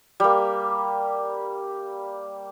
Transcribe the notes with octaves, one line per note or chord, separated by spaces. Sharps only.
G3 A#3